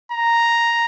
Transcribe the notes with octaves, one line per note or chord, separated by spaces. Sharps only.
A#5